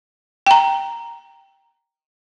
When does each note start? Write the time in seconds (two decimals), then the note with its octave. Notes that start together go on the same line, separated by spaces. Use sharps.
0.46 G5 A#5